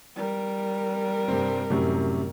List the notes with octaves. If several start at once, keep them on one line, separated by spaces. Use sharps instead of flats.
G3 A#4
G2 C3 C4
F#2 A2 C3